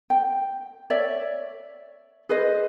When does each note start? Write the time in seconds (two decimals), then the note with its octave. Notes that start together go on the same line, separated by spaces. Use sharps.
0.10 G5
0.90 C#5 D5 E5
2.29 G#4 B4 C5 D#5